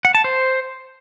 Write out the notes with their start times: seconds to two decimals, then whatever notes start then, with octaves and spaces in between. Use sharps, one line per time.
0.05 F#5
0.15 A5
0.24 C5